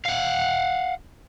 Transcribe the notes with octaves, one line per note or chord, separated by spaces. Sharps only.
F5 F#5